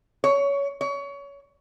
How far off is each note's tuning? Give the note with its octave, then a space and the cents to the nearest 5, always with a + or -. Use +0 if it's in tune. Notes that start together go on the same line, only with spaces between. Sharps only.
C#5 +20
C#5 +25